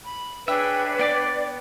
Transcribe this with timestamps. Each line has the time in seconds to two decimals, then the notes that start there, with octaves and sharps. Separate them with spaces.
0.04 B5
0.48 D4 G#4 B4 C#5 E5 G5
0.99 B3 D5 G5 D6